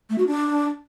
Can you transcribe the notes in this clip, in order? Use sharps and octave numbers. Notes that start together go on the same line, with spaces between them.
A3
F#4
D4